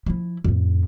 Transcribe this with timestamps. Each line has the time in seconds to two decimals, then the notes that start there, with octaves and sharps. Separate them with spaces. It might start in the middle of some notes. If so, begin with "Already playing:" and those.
0.06 F3 E4
0.44 F2 A2